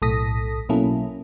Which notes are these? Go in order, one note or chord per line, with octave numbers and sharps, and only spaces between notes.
B1 A2 A4 D#6 A#6 B6
B2 F#3 A#3 C#4 E4 A4